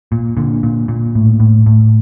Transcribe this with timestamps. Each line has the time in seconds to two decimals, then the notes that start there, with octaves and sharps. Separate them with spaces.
0.12 A#2
0.37 A#2 D3
0.63 A#2
0.88 A#2
1.15 A2
1.40 A2
1.66 A2